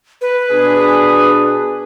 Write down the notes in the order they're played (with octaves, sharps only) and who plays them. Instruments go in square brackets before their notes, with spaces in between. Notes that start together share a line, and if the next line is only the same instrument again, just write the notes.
[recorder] B4
[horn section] B2 D4 G#4